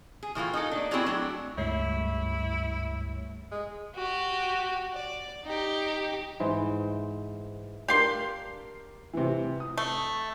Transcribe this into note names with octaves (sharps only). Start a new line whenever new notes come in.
G#4
A2 E3 A3 F4
D#4 G#4 A4
A#3 D4
C4 E4 F#4 G#4 C#5 D5
F#3 A3 D4
C#2 G2 A3 E4 C#5 C7
G#3
F#4 G4
D5
D#4 G4
G#2 E3 C5
D4 G4 A#4 F5 C6
C3 E3
D#6
A3